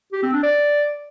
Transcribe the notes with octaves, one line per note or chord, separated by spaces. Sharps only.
G4
C4
D4
D5